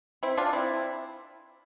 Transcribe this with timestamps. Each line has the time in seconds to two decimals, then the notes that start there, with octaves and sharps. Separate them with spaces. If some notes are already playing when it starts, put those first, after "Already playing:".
0.23 C4 E4
0.37 D4 F4
0.53 C4 E4